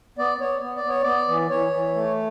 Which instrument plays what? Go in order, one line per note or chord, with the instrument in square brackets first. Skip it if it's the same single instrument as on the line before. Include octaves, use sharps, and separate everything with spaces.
[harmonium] B3 D5
B3 C#5
B3
D5
B3 C#5
B3 D5
E3
E3 C#5
E3
A3